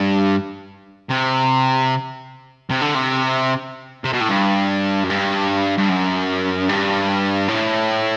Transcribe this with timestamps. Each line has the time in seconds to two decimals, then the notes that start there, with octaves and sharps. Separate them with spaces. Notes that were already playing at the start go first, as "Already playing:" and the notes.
Already playing: G2
1.10 C3
2.70 C3
2.81 D3
2.95 C3
4.04 C3
4.13 B2
4.21 A2
4.29 G2
5.04 F#2
5.10 G2
5.78 G2
5.89 F#2
6.69 G2
7.48 A2